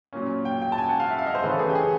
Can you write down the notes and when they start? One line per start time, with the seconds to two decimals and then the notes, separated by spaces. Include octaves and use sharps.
0.13 A#2 F#3 A#3 C#4
0.45 G5
0.62 G5
0.72 A5
0.78 G#5
0.89 F#5
1.00 F5
1.10 E5
1.18 F5
1.26 D#5
1.35 C5
1.43 C#3 E3 A3 C#4 B4
1.52 A4
1.59 G#4
1.70 G4
1.75 G#4